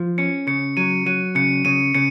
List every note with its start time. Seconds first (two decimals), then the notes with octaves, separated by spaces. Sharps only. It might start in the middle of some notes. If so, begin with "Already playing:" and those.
Already playing: F3
0.18 C#4 C#7
0.47 C#3 C#7
0.77 F#3 D#7
1.06 F#3 D#7
1.35 C#3 C#7
1.65 C#3 D#7
1.95 C#3 C#7